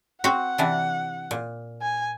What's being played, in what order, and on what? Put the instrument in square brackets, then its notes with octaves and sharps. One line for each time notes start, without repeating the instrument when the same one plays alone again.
[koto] C4 F#4 [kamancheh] F#5
[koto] C3 E3 D4
A#2
[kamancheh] G#5